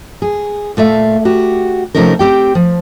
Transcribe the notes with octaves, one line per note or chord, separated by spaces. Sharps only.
G#4
A#2 A3 E5 F5
F#4 G4
C3 F3 A3 C#4 D#4 A#4
C4 G4 G5
F3